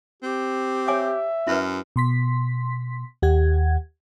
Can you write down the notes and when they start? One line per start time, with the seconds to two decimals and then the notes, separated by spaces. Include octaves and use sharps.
0.23 C4 G4
0.88 C#5 E5 G#5 D6
1.47 F#2 E4 B4
1.96 B2 C6 B6
3.22 D#2 G4 F#5 G#6